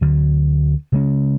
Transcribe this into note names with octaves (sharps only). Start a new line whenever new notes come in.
D2 D3 F#3
C#3 G#3 C#4